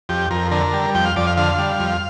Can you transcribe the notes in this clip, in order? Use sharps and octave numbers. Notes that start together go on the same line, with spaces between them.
F2 G4
F2 A#4
D3 A#4
G3
F2 G5
F5
F2 D5
F5
D3 F5
G3
F2